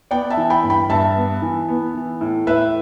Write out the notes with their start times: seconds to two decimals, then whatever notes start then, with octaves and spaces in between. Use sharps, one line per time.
0.11 B3 D5 G5
0.30 E5 A5
0.37 E3
0.50 G5 B5
0.63 G2
0.70 G5 B5
0.90 G2 E5 A5
1.16 B3
1.42 E3
1.68 B3
1.95 E3
2.21 A2
2.47 A2 B4 E5